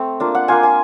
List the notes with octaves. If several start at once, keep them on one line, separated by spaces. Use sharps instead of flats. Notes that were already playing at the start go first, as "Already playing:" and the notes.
Already playing: A3 C4
A#3 D4 F4
F#5
A#3 D4 F4 G#5
G#5